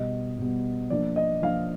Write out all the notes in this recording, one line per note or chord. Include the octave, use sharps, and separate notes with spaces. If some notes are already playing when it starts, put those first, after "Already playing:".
Already playing: B2 G3 B3 D#5
B2 G3 B3
F3 A#3 D4 D5
D#5
F3 A#3 D4 F5